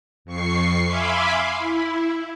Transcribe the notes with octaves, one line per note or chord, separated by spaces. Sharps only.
F2 C#6 C7
E5 F5 G#5 B5 C6 D6
E4